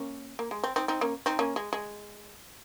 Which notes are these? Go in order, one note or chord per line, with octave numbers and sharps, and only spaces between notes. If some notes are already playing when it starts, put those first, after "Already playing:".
Already playing: A#3 C#4
A#3
G#3
C4
C4 D#4
C4 D#4
A#3 C#4
C4 D#4
A#3 C#4
G#3
G#3